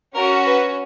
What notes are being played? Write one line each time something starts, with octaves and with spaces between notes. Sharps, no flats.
C#4 F#4 A#4
B4